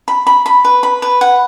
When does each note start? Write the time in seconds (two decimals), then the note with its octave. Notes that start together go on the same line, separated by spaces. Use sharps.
0.08 B5
0.27 B5
0.46 B5
0.65 B4
0.83 B5
1.02 B4
1.21 F#5